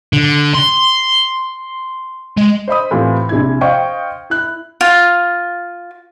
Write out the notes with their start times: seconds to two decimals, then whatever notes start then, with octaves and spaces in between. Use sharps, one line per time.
0.13 D3
0.55 C6
2.37 G#3
2.68 C5 D#5 B5 D#6
2.91 A2 E3 C4 F4 G4
3.29 A#1 C3 E4 G#6
3.61 C5 D#5 F5 G5 C#6
4.30 E4 F#6
4.81 F4